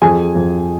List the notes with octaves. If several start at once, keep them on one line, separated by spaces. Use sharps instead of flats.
F2 G#4 G#5
F2